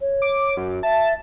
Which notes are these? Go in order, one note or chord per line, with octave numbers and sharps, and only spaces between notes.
C#5
D6
F#2
E5 A5